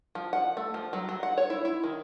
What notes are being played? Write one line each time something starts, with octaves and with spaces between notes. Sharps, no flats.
F3
F#5
A3
F3
F#3
F#3
F#5
C#5
E4
E4
D#3